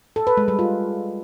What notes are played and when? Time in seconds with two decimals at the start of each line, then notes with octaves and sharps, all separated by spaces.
0.16 A4
0.27 B4
0.37 G#3
0.48 G3
0.59 F4